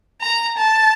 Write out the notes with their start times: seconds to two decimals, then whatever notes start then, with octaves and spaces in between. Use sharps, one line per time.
0.21 A#5
0.58 A5